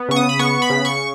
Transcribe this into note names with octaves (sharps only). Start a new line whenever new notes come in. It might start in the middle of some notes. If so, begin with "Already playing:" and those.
Already playing: B3
C#3 C#6
D#6
B5
B3 C#6
B5
C#3
C#6